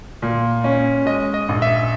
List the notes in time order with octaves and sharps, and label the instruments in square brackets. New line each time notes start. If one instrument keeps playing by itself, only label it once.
[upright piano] A#2
C#4
[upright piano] G#3 [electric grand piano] D#5
[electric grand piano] D#5
[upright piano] A#1
[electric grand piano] E5